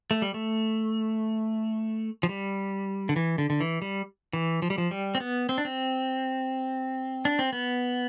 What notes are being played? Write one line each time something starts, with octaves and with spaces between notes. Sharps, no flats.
A3
G3
A3
F3
G3
D3
E3
D3
D3
E3
G3
E3
F3
G3
F3
G3
C4
B3
C4
D4
C4
D4
C4
B3